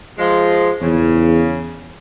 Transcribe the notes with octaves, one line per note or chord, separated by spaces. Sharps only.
F3 G#3
E2 C#3